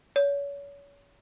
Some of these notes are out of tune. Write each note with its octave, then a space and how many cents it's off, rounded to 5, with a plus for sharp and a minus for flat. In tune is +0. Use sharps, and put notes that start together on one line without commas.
C#5 +35